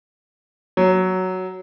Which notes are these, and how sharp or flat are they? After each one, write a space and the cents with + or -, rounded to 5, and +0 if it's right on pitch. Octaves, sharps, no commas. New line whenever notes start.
F#3 +5